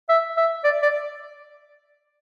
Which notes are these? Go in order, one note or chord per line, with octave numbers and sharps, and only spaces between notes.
E5
E5
D5
D5